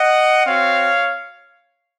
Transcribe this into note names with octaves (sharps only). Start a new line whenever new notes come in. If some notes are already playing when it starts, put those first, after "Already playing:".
Already playing: D#5 F#5
C4 F#4 C#5 F5